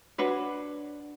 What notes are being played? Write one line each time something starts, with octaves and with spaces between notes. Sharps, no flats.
D4 F#4 B4 C#5